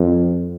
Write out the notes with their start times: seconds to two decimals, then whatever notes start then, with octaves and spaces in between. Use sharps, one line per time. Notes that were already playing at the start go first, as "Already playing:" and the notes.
Already playing: F2